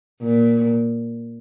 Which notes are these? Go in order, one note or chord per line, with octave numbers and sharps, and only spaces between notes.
A#2